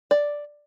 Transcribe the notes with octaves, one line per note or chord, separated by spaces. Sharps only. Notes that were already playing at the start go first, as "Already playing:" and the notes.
D5